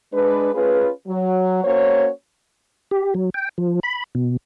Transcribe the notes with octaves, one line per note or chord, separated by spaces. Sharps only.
G#3 D4 B4
A3 C#4 F4 G#4 B4
F#3
A#3 C#4 F#4 C5 C#5
G4
F#3
G5
F3
B5
B2